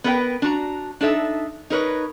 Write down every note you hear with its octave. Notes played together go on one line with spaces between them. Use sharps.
B3 A#4 B4 G5
D4 F#4 A#5
D4 D#4 A4 E5
D#4 A#4 B4 C#5